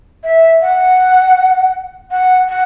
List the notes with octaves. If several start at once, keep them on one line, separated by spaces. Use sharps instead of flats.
E5
F#5
F#5
F#5